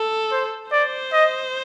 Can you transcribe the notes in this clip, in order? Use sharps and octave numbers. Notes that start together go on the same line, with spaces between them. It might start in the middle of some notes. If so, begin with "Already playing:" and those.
Already playing: A4
C5
C5 D5
D#5